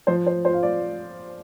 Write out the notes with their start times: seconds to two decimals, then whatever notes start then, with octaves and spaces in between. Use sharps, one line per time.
0.07 F3 C5
0.26 C5
0.45 F4 C5
0.53 F5
0.63 D5